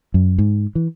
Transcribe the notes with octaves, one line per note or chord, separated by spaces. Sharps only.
F#2
G#2
E3